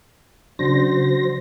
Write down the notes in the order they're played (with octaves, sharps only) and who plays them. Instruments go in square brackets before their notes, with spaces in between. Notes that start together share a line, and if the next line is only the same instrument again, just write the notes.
[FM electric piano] C#3 D4 [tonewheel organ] F#3 C5 A#6